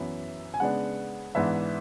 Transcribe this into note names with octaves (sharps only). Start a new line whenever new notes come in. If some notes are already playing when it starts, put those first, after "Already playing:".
Already playing: F#2 E3 B3 E5
G#5
C#3 G#3 B3 D4 F#5
G#2 E3 B3 D4 E5